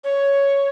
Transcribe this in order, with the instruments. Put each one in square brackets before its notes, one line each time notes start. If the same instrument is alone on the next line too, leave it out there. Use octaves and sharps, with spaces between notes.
[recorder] C#5